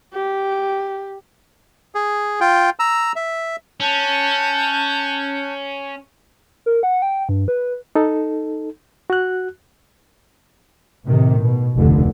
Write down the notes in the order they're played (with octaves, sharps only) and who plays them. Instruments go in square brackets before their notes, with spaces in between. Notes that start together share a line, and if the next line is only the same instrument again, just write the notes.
[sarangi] G4
[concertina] G#4
F4 G5
A#5 E6
E5
[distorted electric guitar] C#4 [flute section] A5 F#6 G6
[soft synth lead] A#4
F#5
G5
G2
B4
[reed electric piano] D#4 A4
F#4 F#6
[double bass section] A2 C3 D#3
B2
F1 D2 D3